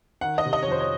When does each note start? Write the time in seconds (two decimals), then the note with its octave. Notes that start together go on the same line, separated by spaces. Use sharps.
0.21 D#3 F#5
0.38 D#5
0.46 C3
0.53 D#5
0.63 C#5
0.68 F2 C5
0.80 C#5